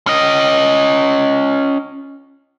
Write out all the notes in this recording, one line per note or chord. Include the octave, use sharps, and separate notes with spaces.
C#4 D#5